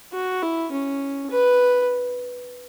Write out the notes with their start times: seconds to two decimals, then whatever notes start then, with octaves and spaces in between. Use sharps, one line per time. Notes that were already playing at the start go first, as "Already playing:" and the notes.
0.13 F#4
0.42 E4
0.72 C#4
1.30 B4